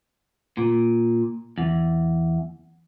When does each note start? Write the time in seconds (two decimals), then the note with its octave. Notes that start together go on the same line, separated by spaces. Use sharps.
0.57 A#2
1.58 E2